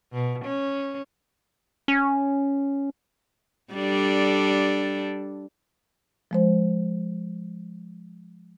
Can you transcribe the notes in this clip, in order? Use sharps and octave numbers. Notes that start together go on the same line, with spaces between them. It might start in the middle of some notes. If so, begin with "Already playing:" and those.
B2
C#4
C#4
G3 D4 A4
F3 G#3 C5